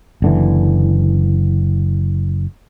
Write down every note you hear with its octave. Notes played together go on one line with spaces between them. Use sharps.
F#1 D3 E3